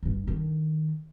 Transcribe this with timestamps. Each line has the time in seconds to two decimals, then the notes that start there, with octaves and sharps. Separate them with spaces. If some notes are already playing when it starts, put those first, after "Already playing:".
0.03 G1 G2
0.27 D3 D#3